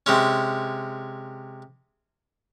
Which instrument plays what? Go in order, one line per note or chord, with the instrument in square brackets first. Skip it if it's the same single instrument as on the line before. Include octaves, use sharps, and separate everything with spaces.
[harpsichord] C3 G#3 C#4